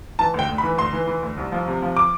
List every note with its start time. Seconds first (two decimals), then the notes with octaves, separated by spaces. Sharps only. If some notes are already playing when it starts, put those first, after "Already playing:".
0.19 E3 A5
0.34 D2 G5
0.49 D2
0.58 B5
0.63 E3
0.78 D2 C6
0.93 E3
1.07 E3
1.23 D2
1.37 C2
1.52 F3
1.68 C3
1.82 F3
1.97 D6